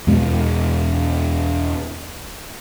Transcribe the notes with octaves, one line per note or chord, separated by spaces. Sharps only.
E2 B2 G#3 B3